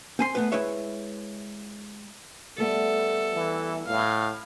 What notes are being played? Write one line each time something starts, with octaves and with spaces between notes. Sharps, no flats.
C4 G#5 C6
A3 B3 B4
G#3 E4 B4 C#5 E5
G3 A3 B3 A4
E3
A2 F5